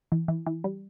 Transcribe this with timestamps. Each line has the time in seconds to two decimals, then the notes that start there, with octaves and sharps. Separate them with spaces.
0.12 E3
0.28 E3
0.47 E3
0.64 G3